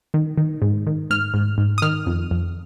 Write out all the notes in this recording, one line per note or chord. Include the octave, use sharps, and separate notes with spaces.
D#3
D#3
G#2
D#3
G#2 F6
G#2
G#2
D#6
D#3 F6
F2
F2